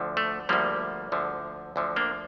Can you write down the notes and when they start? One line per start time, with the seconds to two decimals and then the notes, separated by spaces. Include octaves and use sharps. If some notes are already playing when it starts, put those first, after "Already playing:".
Already playing: D2 D3 F3
0.17 A3
0.49 D2 D3 F3 G3 A#3
1.12 D2 D3 F3
1.76 D2 D3 F3
1.96 A#3 D4